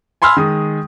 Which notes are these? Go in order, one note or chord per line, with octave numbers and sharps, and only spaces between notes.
G#5 B5 C6 E6 F6
D#3 G#3 D#6